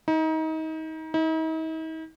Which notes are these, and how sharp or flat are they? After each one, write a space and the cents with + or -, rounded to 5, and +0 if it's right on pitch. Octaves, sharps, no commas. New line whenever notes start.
D#4 +30
D#4 +45